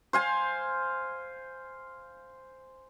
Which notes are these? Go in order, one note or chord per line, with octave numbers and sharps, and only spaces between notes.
C5 F5 G#5